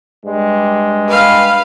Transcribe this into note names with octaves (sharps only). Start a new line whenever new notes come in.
G2 G3 G#3
B4 F5